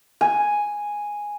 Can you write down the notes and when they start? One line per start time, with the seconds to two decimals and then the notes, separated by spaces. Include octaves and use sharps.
0.21 G#5